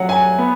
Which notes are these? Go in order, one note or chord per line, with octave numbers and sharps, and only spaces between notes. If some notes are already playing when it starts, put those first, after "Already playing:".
Already playing: F#3 C#4 F#5
G#5
B3